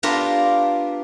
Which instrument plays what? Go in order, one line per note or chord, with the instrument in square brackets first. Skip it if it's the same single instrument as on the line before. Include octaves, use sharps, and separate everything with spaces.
[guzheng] B3 D4 F4 G4 A#4